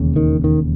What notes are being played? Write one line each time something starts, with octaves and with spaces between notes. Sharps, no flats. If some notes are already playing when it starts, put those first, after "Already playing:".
Already playing: E1 D#2 C#3
D#3
D#3